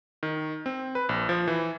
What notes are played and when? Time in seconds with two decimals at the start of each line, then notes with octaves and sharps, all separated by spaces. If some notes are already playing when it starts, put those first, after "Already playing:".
0.23 D#3
0.66 C4
0.95 B4
1.09 A#1
1.29 F3
1.48 E3